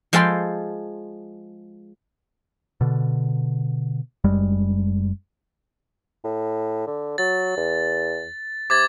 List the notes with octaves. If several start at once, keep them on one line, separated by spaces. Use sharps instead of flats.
F3 G#3 A4 G5 B5 C6
B2 D3
F#1 F#2 G3 G#3
A2
D3
F#3 A6
E2
C3 D6 G#6 A6